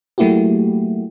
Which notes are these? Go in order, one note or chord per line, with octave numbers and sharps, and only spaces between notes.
F#3 A3 A#3 E4 F#4 G4